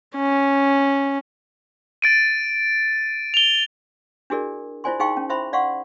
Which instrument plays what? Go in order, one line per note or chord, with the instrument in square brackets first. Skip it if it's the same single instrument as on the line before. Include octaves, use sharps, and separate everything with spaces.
[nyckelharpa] C#4
[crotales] A6 D7 D#7
F7 G7
[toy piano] D4 E4 F#4 G#4 A#4 D5
E4 F4 C5 D5 G#5 C6
D#4 G#4 F5 G5 C6 C#6
C#4
E4 C5 E5 B5 C6
D5 F5 F#5 C6 C#6